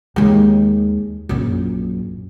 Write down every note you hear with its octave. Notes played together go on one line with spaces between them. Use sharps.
D#2 G#3
A#1 F#2